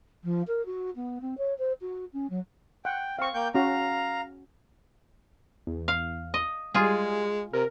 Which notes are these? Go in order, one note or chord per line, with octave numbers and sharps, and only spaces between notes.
F3
A#4
F#4
B3
C4
C#5
C5
F#4
C#4
F#3
F#5 G5
C4 F5 C#6
A#3 G5 G6
C#4 F#4 F5 A#5
E2
F5
D#5
G3 G#3 F4 G#4
C3 A#4